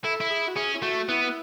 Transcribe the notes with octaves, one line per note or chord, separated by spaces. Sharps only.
E4 A4
E4
G#4
F#4
C#4 G#4
E4
A3 F#4
B3 E4